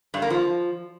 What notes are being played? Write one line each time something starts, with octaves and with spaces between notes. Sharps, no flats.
G2
A#3
F3